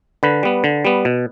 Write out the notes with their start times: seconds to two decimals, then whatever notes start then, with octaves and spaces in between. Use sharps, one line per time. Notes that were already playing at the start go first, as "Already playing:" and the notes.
0.23 D3 B4
0.43 G3 B3
0.64 D3
0.85 G3 B3
1.05 B2